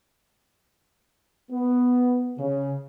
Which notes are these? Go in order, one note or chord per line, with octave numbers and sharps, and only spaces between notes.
B3
C#3